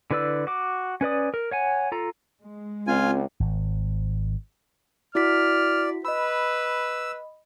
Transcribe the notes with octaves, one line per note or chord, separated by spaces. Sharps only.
D3 E4 B4 D5 E6
F#4 D6
C#4 B4 D5 D#6
A#4
C#5 F#5 G#5
F4 A4 A#5
G#3
C#2 C4 F4 G#5
G#1
E4 F#4 D5 F6 B6
B4 D#5 B5 E6